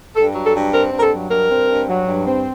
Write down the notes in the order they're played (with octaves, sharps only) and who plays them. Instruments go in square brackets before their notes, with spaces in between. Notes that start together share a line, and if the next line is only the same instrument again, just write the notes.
[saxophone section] G2 A4
F#3
A4
G2
C4 A#4
G2
A#4
A4
F#3
G2 A#4
C4
G2
F#3
G2
C4